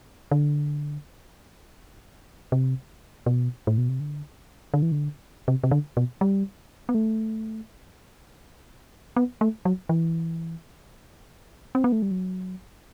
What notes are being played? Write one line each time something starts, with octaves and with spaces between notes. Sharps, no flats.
D3
C3
B2
A2
B2
C3
D3
D3
E3
D3
C3
C3
D3
B2
G3
B3
A3
B3
A3
F#3
E3
C4
B3
A3
G3
F#3